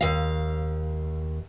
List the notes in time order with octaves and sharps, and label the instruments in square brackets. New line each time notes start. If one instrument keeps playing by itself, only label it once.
[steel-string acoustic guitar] D#2 F5